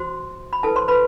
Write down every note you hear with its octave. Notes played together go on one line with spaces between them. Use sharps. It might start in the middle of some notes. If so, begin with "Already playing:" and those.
Already playing: F#4 C5 C6
B5
E4 A4 B4 A5
C5 C6
B4 B5